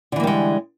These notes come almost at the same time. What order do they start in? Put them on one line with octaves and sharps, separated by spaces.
D3 E3 A#3 G3 G#3